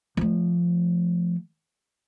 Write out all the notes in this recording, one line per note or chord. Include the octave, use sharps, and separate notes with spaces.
F3 A3